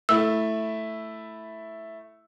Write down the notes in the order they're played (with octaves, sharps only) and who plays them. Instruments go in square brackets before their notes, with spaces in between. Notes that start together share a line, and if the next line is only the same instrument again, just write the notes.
[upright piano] A3 E4 [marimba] E6